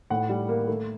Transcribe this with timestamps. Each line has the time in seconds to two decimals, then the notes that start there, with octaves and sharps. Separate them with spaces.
0.10 A2 F#5
0.29 G3
0.49 A#3
0.68 A3